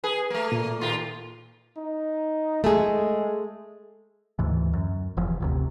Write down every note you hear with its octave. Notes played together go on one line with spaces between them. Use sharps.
G#4 B4
A3 A#3
A#2
D#2 F4
D#4
G#3 A3 G#4
D2 G#2 E3
F#2
F1 E2 F3
G1 D2 C3